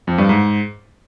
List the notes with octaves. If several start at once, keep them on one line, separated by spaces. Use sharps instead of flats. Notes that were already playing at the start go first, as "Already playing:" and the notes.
F2
G2
G#2